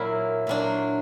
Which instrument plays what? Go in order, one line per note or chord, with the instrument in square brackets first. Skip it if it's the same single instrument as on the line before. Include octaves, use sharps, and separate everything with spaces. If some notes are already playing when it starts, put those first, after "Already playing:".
Already playing: [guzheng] A#2 F#3 A#3 E4
A#2 F#3 A#3 D4